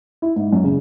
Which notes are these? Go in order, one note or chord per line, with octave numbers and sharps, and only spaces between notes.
E4
G#2
F#2
C#3